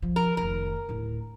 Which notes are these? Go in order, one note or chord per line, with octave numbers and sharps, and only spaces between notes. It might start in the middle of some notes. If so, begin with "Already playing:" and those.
F3
A#4
F1 D#3 A#4
D1 E4